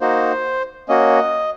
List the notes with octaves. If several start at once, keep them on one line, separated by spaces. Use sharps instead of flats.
A#3 D#4 F#4 C5
A#3 C#4 F#4 D#5